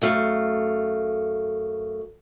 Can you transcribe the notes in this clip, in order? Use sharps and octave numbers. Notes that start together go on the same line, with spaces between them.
F#2 A3 F5